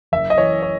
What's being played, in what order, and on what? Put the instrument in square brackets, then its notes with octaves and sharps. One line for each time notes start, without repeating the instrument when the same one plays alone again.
[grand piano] F#1 E5
D#5
E3 C#5
C#5